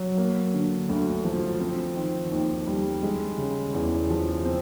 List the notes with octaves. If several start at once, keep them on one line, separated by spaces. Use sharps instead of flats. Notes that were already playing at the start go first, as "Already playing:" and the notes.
Already playing: F#3
A#3
D3
D2
F3
C4
D#3
D#2
G3
G#3
C#3
E2
F3
C4